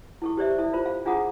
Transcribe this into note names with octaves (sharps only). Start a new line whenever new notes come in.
E4 A4 C#6
G4 C5 D5 E5
E4 A4 E5
F4 A#4 C5 B5
F5
D4 F4 G#4 F#5 A#5 D#6